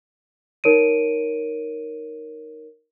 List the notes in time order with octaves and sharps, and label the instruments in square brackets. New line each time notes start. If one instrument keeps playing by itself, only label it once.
[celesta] D#4 A#4 C#5 D7 D#7